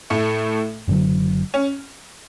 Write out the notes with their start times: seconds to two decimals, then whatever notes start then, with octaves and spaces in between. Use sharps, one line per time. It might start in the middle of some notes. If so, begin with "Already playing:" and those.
0.10 A2 A3
0.88 F#1 F#2 D3 F#3
1.54 C#4